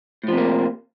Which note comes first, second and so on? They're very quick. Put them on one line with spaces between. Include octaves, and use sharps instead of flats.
A2 F3 C3 A#3